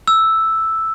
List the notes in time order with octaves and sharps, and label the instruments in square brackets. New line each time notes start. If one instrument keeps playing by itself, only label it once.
[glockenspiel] E6